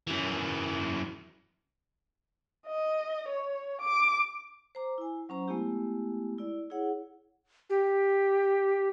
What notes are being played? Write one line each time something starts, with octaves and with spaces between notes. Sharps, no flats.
F#2 E3
D#5
C#5
D6
C5 A#5 D6
E4 G#5
F#3 C#4 C5 A#5
G#3 A3 B3 E4 G4
E4 D5
E4 G#4 C#5 F#5
G4